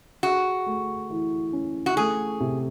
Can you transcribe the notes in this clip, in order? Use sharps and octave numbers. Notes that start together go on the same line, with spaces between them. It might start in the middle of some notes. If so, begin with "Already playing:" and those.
F#4 G#4
A3
E3
C#4
F#4
A3 G#4
C3